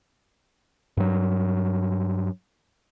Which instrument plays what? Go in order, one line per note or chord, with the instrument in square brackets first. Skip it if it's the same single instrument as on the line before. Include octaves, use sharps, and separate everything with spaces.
[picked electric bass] G2 F#3